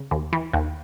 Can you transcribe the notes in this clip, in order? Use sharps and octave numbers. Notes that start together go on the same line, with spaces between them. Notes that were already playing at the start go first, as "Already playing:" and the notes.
Already playing: C#3
D#2
E3
D#2